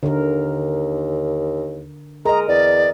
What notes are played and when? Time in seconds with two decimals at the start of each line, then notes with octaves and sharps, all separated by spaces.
0.03 D#2 D3 A#4
2.25 G#3 A#4 D#5 A#5
2.48 E2 D5